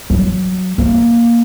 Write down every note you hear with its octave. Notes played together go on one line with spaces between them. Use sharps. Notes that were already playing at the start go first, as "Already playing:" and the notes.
F#3
A#3